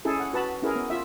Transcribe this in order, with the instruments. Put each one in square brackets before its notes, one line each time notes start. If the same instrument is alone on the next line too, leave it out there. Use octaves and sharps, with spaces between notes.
[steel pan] C#4 E4 G#4 A4
F#5
F#4 B4 A5 B5
C#4 E4 G#4 A#4
B3
F4 E5